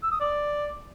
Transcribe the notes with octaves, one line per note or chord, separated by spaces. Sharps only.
E6
D#6
D5